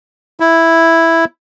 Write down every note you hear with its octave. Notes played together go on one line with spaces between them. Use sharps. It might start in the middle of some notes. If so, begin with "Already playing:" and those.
E4